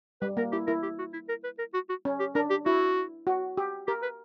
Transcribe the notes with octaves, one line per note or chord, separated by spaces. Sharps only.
G3 B4
A#3 A#4
E4 G4
E4 A#4
G4
F#4
E4
A#4
B4
A#4
F#4
F#4
C#4
G4
D4 A#4
G4
E4 F#4
F#4
G4
G4 A#4
B4